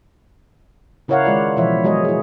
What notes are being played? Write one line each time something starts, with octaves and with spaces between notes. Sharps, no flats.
C#3 E4 A#4 C#5 F5 F#5
D#3 G#3 F4 D5
B2 E3 F3 E4 C#5 E5
F#3 G#3 G#4 C#5 D#5
E4 G#4